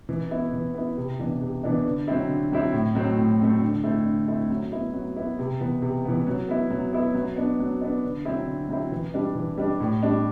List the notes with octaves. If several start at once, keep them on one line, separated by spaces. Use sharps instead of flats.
E3
B3 E4
E3
B3 E4
C3
E3 B3 D4
C3
E3 B3 D4
D3
F#3 C4 E4
D3
F#3 C4 E4
A2
F#3 A3 C4
A2
F#3 A3 C4
D3
A3 C4 E4
D3
A3 C4 E4
F#3
B3 E4
F#3
B3 E4
C3
E3 B3
C3
E3 B3
F#3
B3 E4
F#3
B3 E4
F#3
B3 D4
F#3
B3 D4
D3
F#3 C4 E4
D3
F#3 C4 E4
E3
G3 D4
E3
G3 D4
A2
G3 D4